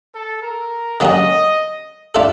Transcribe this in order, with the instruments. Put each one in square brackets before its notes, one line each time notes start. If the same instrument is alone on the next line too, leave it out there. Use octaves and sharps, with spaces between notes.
[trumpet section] A4
A#4
[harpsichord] D3 F#3 A#3 C#4 F#4 [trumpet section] D#5
[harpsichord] A3 D4 F4 A4